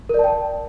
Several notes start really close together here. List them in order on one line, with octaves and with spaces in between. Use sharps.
A#4 D5 A5 G5